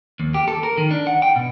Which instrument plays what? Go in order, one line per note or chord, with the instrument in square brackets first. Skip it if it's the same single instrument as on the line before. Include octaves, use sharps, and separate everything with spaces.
[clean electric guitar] D#2
G4
A4
A#4
D#3
D4
F#5
G5
B2